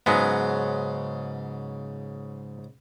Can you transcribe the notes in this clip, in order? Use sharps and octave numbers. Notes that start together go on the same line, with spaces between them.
G#2 C#3 F#3 G#3 B3